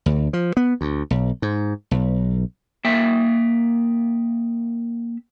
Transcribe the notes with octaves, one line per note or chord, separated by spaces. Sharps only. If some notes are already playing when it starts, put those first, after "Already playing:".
D2
F3
B3
D2
B1
G#2
B1
A#3 E5 G5